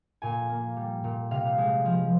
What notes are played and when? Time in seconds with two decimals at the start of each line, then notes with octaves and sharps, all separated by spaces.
0.22 A#2 G#5
0.49 A#3
0.76 G3
1.04 A#2
1.31 C3 F5
1.58 G#3
1.85 F3